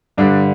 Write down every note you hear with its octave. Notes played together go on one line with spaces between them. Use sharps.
G2 D3 G3 D4